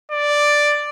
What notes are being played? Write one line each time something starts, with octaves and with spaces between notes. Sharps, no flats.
D5